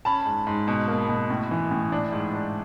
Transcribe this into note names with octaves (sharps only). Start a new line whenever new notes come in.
C#4 A5 B5
G#2
G#2
B2
A#3
B2
A2
E3
A2
D4
G#2
D4